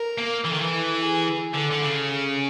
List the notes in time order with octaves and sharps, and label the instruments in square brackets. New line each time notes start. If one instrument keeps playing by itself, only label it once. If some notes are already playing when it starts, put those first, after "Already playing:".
Already playing: [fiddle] A#4
[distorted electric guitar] A#3
[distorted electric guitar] E3 [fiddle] A4
[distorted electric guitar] D#3
E3
[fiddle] G#4
[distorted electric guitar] D3 [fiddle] A4
[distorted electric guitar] D3
C#3
[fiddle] G#4